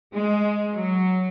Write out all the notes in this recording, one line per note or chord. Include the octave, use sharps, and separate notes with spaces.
G#3
F#3